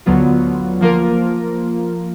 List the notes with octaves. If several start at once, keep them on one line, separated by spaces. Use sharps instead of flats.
D2 D3 F#3 B3 F4
F3 A#3 F4 A#4